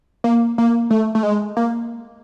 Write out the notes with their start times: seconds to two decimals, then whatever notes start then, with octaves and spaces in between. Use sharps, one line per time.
0.24 A#3
0.58 A#3
0.91 A3
1.15 A3
1.23 G#3
1.57 A#3